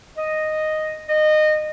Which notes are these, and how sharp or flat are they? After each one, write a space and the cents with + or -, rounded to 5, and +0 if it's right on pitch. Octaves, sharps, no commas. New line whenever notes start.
D#5 -5
D#5 -20